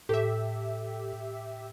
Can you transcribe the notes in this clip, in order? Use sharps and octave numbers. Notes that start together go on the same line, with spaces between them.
A2 G4 A4 E5